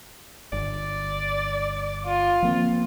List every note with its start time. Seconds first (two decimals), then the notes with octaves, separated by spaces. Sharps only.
0.52 G1 D5
2.05 F4
2.42 F3 A#3 C4